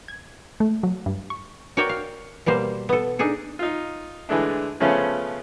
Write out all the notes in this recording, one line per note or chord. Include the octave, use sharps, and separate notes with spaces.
G#6
A3
F#3
G2
C#6
F#4 A#4 C#5 D5 G5
F5
B2 G3 A#3 C5
B3 A4
D4 D#4 G#4 A4
D#4 F4
D3 E3 G#3 A3 D4
C#3 F3 A3 B3 C#4